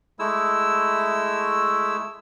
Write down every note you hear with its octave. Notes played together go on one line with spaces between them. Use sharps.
G#3 A3 E4 E6